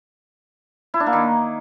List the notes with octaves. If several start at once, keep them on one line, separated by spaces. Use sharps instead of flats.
E4
D4
A#3
D#3